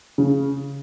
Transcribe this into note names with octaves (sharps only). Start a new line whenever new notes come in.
C#3